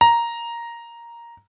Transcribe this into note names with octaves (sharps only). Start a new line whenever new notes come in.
A#5